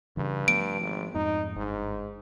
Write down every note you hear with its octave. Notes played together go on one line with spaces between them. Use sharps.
G2 C#3 E3
F3 A3 B3 D7
G#1
F2 G#2 D#4
G1 G#2